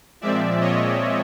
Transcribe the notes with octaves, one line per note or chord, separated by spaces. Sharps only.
A#2 F3 G#3 C4 D5 E5
C#5 D#5